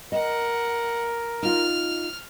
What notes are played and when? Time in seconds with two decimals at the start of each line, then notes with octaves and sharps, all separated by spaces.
0.12 A#4 D#5 F#5
1.43 D#4 F4 F6